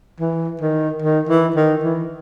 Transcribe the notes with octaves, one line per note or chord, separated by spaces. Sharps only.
E3
D#3
D#3
E3
D#3
E3